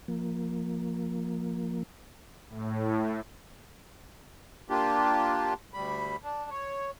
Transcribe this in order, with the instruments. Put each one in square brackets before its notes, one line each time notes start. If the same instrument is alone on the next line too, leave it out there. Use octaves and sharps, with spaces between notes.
[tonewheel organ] F3 A#3
[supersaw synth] A2
[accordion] A#3 D4 F4 G4
D2 G3 B5
D4
C#5